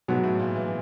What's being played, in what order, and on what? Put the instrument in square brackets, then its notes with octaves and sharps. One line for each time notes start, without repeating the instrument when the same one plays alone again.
[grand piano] G#2 [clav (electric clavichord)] B2 F#3 B3
[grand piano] A2
A#2
E3